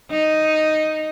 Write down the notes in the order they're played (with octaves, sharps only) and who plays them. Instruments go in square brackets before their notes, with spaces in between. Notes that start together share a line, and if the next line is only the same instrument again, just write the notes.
[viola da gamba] D#4